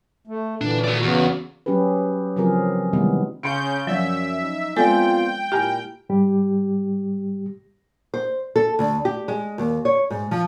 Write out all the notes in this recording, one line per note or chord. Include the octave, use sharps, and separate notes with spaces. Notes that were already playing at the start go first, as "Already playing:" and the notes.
A3
A#2 D3 E3 D4
F#4 D5
E2 C#3 B3 F#4
F#3 C#4 G4 G#4 B4
C#3 F3 F#3 C4 G#4 A#4
C3 D#3 E3 G3 G#3 B3
C#3 C6 G6 C#7 D7
F#2 F3 F#3 C#4 D5 E5
D#4
G#3 B3 C4 F4 A4 D5 G5 G#5
A#2 E4 G4 G#5 A#5 F6
G#2 G3 G4
C5
A4
D2
G4
G#3
D#2
C#5
G#2
F3